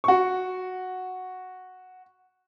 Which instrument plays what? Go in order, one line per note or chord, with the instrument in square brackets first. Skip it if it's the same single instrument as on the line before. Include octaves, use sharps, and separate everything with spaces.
[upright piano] F#4 C#6